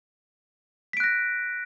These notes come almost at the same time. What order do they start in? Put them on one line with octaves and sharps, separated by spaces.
B6 D7 F#6 A#6